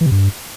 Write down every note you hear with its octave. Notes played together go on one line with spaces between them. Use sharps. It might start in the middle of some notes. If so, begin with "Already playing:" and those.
E3
C3
G2